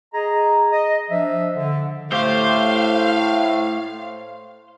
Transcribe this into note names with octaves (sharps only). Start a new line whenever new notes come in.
G#4 D#5 A#5
D#5
F3 D4 E5
D3
A2 A3 G4 C5 F5